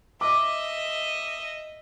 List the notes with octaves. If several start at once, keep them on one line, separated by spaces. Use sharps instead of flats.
D#5 E5 D6